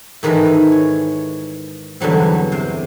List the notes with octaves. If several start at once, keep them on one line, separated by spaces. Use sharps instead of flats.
G#2 D#3 E3 G#3 A4 A#4
C#5
E2 G2 D3 F#3 C4
C3 C5